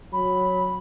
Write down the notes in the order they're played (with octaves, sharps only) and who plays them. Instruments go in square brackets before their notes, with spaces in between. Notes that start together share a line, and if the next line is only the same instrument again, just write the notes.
[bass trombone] F#3 [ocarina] B5